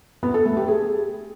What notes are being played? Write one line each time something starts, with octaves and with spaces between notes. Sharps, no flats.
B3
A4
A3
G4
G#4